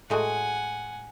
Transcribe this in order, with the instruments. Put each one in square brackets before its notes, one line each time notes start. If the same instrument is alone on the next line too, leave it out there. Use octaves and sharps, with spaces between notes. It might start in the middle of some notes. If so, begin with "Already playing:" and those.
[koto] A2 G#3 F#4 [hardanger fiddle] F#5 G#5